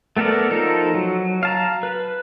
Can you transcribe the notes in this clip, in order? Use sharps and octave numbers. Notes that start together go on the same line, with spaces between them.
A3 B3 A4 A#4 D5
F3 D#4 A4 A#4
F#3
F5 A5 A#5
B4